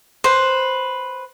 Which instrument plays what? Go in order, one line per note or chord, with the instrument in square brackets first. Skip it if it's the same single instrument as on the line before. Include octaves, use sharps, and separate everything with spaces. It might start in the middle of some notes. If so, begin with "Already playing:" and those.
[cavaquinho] B4 C5